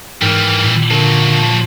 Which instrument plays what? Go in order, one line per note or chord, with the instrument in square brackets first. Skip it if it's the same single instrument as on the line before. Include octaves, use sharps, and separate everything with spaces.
[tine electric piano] G#2 A#4 F6 [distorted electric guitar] E3 G3
[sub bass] A#2
[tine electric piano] D3 A#4 [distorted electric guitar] F3 F#3